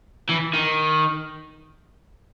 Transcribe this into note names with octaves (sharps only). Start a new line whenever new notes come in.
E3
D#3